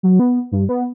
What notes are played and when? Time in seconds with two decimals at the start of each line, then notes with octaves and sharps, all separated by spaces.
0.03 F#3
0.19 B3
0.52 G2
0.69 B3